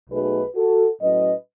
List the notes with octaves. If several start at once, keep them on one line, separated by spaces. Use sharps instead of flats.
B1 B2 A3 D#4 G#4 B4
F#4 A4
A2 F#3 C#4 B4 D#5